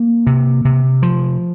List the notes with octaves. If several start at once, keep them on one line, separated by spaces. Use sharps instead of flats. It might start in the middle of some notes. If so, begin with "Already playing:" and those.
Already playing: A#3
C3
C3
F3